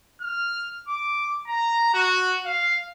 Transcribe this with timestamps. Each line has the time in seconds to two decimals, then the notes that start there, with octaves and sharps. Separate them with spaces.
0.21 F6
0.87 D6
1.47 A#5
1.94 F#4
2.45 F5